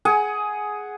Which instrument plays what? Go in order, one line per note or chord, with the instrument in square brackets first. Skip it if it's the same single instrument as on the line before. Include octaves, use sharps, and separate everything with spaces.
[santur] G#4 F#5 G#5